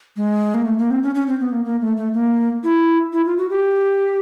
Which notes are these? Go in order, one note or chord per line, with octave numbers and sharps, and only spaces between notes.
G#3
A#3
A3
A#3
C4
C#4
C#4
C4
B3
A#3
A#3
A3
A3
A#3
E4
E4
F4
F#4
G4